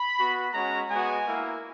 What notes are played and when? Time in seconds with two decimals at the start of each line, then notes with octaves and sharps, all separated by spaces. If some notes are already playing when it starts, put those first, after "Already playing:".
Already playing: B5
0.18 B3 F#4
0.53 G#3 C#4 F#4 A#5
0.90 G#3 B3 F#4 G#5
1.25 A#3 E4